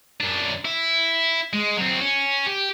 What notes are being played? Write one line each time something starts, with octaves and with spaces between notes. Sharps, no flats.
F#2 D4
E4
G#3
F#3 C4
C#4
G4